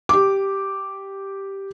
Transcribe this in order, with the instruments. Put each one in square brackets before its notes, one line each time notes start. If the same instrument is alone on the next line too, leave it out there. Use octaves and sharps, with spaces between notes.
[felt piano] G4 D6